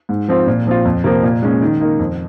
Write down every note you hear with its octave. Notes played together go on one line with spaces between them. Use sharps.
G#2
F3 C4 F4
A#2
F3 C4 F4
F2
C3 F3 A#3
A#2
G#3 C#4
D#3
A#3 D#4
F2